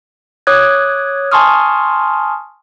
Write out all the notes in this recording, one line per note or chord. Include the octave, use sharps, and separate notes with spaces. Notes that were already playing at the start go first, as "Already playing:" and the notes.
C#5 D6 D#6 F#6 G#6
G#5 A5 C6 C#6 D#6 F6